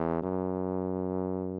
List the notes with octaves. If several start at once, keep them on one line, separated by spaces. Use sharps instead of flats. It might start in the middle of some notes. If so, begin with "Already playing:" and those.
Already playing: E2
F#2